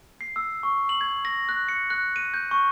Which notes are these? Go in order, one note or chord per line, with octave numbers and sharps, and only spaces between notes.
C7
E6
C#6
F#7
G#6
A#6
F#6
C#7
F#6
D#7
G6
C#6